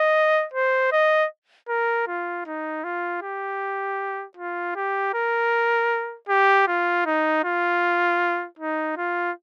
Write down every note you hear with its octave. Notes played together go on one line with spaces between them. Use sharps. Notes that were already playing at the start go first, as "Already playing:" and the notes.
Already playing: D#5
C5
D#5
A#4
F4
D#4
F4
G4
F4
G4
A#4
G4
F4
D#4
F4
D#4
F4